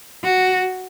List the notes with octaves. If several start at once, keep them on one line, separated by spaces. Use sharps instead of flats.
F#4